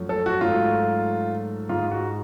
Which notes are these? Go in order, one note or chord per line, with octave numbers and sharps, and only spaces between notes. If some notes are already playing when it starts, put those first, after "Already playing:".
Already playing: F#2 F3 A3
A4
F#4
G#2 F#3 A3 F4
G#2 G#3 F4
F#4